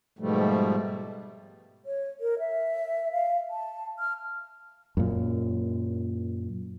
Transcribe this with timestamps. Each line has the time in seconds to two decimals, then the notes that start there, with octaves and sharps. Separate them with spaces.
0.19 G#2 B2 F3 G3 A3
1.86 C#5
2.21 A#4
2.39 E5
3.12 F5
3.50 A5
3.99 F6
4.97 F#2 A#2